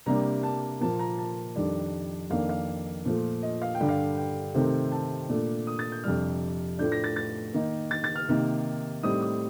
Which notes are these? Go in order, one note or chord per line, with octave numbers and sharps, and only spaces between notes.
C3 G3 A#3 D4 A#5
A5
A#2 F3 A#3 A5
A#5
A5
F2 D#3 G3 D4
F2 D#3 A#3 D4 F5
F5
A#2 F3 A3
D#5
F5
G5
G2 D3 G3
F5
G5
C3 D#3 A3 C4
A5
A#2 A3 D4
D#6
A6
G6
F2 C3 G3 D4 F6
A2 F3 A3 D4 G6
A#6
A6
A6
D#3 A#3 D#4
A6
A6
F6
C3 D#3 A#3 D#4
A2 G3 C4 D#4 D#6
D#6